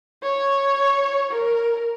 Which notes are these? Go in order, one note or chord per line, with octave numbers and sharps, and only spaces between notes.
C#5
A#4